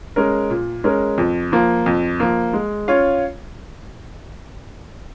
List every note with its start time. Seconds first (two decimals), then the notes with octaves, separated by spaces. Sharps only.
0.16 G#3 C#4 A#4
0.50 A#2
0.84 G#3 C#4 A#4
1.18 F2
1.52 F3 A#3
1.86 F2
2.20 F3 A#3
2.53 G#3
2.88 C#4 F4 C#5 F5